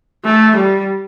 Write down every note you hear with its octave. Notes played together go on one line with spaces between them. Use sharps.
A3
G3